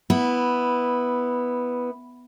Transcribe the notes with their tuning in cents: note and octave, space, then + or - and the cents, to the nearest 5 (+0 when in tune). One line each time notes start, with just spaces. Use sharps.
B3 +0 E4 -10